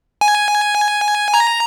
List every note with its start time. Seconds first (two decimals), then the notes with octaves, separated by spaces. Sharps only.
0.21 G#5
1.34 A#5